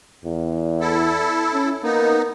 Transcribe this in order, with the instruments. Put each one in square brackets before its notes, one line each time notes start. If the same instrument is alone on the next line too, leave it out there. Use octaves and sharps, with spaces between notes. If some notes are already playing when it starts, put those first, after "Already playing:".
[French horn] E2
[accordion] E4 A4
[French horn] C#4
[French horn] A#3 [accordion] B3 D#4